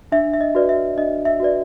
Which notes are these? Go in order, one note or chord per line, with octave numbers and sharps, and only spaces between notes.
D4 E5
E5
D#5
F#4 B4 D5
E5
D4 D#5
E5
F#4 B4 D5